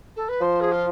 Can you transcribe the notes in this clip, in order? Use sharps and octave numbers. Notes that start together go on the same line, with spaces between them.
A4
B4
F3 C5
G#4
F4